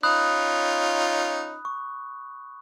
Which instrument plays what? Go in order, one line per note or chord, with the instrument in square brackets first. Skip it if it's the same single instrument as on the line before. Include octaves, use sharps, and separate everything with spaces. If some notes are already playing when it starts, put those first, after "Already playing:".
[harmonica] C#4 D#4 F4 [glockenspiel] B5 D#6 F#6
[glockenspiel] C#6